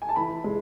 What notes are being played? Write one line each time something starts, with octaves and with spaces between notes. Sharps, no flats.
G#5
A5
E3 B5
G#3